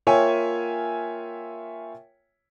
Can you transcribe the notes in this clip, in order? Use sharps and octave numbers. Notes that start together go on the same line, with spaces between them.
A#3 F4 C#5 E5 G5 G#5